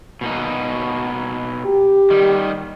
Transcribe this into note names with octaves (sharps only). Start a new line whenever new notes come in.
B2 A#3 D#4
G4
D#3 G3